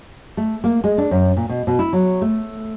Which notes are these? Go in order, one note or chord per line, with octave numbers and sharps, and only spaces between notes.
A3
A#3
G#3
D4
F#2
A#2
B2
B2
E4
F#3
A3